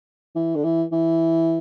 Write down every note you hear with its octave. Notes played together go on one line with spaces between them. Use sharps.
E3
D3
E3
E3